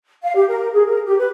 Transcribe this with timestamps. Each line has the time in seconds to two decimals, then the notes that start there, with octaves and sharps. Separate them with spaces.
0.23 F5
0.35 G4
0.48 A#4
0.73 G#4
0.86 A#4
1.04 G4
1.18 B4